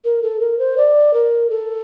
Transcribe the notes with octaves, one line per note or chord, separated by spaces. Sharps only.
A#4
A4
A#4
C5
D5
A#4
A4